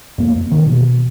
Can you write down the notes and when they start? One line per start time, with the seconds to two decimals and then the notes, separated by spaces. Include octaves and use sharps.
0.18 F2 A#3
0.51 D#3
0.66 B2